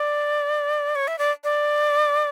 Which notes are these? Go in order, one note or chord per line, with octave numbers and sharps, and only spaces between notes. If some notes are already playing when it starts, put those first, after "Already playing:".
Already playing: D5
C#5
E5
D5
D5